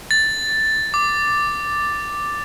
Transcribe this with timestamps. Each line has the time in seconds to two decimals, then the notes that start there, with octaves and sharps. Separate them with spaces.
0.11 A6
0.94 D6